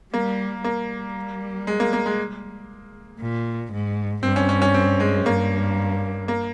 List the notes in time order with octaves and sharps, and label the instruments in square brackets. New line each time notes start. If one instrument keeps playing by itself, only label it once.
[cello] G3 [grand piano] A#3
[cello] G3 [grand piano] A#3
[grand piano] G#3
A#3
A#3
G#3
[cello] A#2
G#2
[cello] G2 [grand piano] C4
[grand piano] C#4
C#4
C#4
C4
G#3
[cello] G2 [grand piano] A#3
[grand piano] A#3